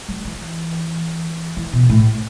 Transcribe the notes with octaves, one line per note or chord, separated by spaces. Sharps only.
F#3
E3
E3
B2
A2